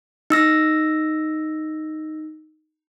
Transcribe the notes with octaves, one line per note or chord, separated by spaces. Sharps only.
D#4 E6 A#6